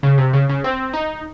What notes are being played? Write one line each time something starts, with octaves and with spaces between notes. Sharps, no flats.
C#3
C3
C#3
C#3
C4
D#4